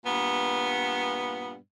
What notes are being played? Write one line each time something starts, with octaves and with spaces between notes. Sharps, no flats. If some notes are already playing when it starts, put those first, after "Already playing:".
G2 A#2 B3